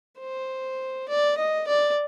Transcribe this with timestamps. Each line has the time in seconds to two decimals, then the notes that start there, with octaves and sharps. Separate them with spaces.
0.19 C5
1.09 D5
1.37 D#5
1.67 D5